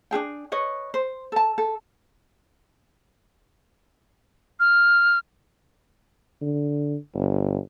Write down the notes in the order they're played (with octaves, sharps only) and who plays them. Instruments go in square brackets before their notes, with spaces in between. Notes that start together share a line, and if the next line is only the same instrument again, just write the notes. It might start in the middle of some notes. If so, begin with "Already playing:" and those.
[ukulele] D4 F#4 G#4 G5
B4 C#5 D#5
C5
A4 A5
A4
[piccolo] F6
[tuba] D3
G1